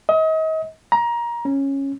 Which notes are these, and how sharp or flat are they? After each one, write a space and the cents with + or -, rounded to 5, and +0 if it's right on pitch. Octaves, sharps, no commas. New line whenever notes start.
D#5 +35
A#5 +20
C#4 -10